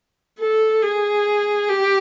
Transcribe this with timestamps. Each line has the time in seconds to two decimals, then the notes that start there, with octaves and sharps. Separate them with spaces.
0.40 A4
0.83 G#4
1.69 G4